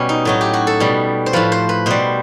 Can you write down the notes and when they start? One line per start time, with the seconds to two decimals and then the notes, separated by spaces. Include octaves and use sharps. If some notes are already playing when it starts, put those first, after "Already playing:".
Already playing: B2 G3 C#4
0.09 D#4
0.25 A2 F#3 D#4
0.41 G4
0.54 F#4
0.67 A4
0.80 B2 G3
1.26 C5
1.33 A2 F3 B4
1.52 C5
1.69 B4
1.86 B2 G3 C5